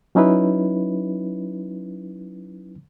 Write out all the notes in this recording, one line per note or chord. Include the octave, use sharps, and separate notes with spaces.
F#3 C#4 D#4 E4 B4